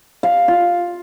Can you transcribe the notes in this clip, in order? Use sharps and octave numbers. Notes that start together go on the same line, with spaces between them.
F5
F4